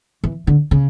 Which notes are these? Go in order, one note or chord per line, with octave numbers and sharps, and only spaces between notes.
E3
D3
C#3